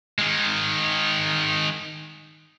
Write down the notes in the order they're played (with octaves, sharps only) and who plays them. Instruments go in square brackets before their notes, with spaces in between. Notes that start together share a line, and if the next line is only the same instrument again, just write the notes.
[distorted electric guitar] D#3 G#3